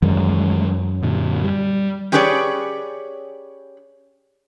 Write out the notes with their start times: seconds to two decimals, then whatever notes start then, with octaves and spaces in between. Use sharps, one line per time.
0.02 F#2 D#3 E3 G#3
1.03 A#2 D3
1.44 G3
2.12 C#4 G4 G#4 B4 C#5 D5